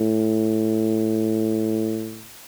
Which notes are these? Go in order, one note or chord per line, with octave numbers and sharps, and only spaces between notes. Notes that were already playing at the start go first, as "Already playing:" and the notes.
Already playing: A2